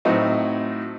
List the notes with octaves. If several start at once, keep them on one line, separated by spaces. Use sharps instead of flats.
A2 F#3 C4 D#4 F#4